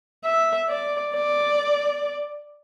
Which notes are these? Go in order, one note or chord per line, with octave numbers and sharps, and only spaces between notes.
E5
D5
D5